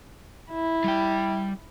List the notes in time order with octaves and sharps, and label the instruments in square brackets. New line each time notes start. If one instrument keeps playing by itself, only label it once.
[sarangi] E4
[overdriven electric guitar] G3 G5